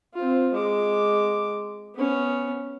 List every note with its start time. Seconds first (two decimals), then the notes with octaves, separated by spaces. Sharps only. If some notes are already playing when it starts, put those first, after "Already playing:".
0.14 C4 F4
0.53 G#3 D6
1.95 B3 C#4